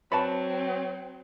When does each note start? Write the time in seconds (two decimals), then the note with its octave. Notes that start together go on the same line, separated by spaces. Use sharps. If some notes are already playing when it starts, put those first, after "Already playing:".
0.12 F#3 C4 B4 C#5 D5 A5 B5